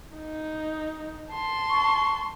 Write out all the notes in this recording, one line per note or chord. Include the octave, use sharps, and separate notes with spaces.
D#4
A5 C6
C#6